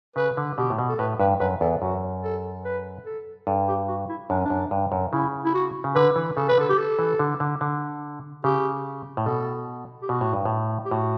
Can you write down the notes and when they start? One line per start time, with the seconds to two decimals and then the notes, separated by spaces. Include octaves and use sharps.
0.16 C#3 B4
0.37 D3
0.58 B2 G4
0.70 A2
0.79 B2
0.89 A4
0.99 A2 B4
1.20 G2 B4
1.40 F#2 B4
1.61 E2 A4
1.82 F#2 F#4
2.23 A4
2.65 B4
3.06 A4
3.47 G2 A4
3.68 G4
3.88 F#4
4.09 E4
4.30 F#2 D4
4.38 C#4
4.45 D4
4.50 F#2
4.71 G2
4.92 F#2
5.13 C#3 E4
5.45 E4
5.54 F#4
5.84 C#3
5.95 D3 B4
6.16 E3
6.37 C#3 A4
6.48 B4
6.58 D3 A4
6.69 G4
6.78 A4
6.99 E3
7.19 D3
7.40 D3
7.61 D3
8.44 C#3 G4
9.17 A2
9.26 B2 A4
10.02 G4
10.09 B2 F#4
10.21 A2
10.33 G2
10.45 A2
10.85 G4
10.91 A2 F#4